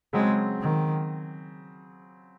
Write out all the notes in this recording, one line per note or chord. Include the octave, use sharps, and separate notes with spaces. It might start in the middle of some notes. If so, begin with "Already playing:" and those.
C#3 F#3 G#3 C4
D#3